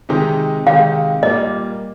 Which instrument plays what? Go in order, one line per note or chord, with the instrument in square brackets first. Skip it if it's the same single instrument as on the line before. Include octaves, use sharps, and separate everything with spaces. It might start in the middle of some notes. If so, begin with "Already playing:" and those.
[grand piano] C3 D#3 G#3 D#4 G4
[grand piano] C3 D#3 G#3 D#4 G4 [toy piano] F5
[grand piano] A#2 G3 A#3 [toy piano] D#5